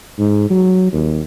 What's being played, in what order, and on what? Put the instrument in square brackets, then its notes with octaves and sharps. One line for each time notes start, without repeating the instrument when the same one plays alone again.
[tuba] G#2
F#3
D#2